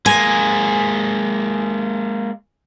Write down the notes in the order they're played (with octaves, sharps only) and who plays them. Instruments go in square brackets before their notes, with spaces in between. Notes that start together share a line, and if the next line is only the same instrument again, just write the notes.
[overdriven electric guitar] G#3 A#3 [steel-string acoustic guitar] G#5